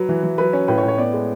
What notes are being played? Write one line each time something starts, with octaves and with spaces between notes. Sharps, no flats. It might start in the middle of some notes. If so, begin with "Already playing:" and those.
Already playing: F#3 B4
E3
E3
F#3 B4
C#4
A2 B4
C#5
A2
C#5
B3 D5
G#3